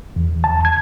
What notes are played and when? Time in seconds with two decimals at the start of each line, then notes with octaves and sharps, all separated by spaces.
0.16 E2
0.44 A5
0.65 G#6